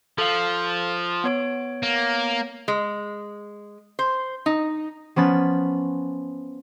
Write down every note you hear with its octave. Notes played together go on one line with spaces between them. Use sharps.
F3 A4 F5
B3 C#5 D7
A#3
G#3
C5
D#4
F3 B3 C#4 B5 A6